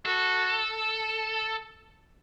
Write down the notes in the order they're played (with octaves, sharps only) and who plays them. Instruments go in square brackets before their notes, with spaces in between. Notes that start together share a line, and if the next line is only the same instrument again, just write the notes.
[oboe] F#4 [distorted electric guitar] A4